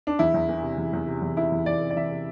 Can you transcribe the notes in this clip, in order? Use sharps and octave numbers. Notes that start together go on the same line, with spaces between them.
D4
E2 E4
E2
E3
C3
E2
E2
C3
E2
C3 E4
E2
E2 D5
C3
D5
E3 E5
C3